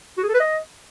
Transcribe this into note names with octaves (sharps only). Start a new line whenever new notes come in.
F#4
G#4
A4
B4
D#5